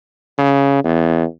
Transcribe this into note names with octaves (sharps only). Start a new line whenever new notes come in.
C#3
E2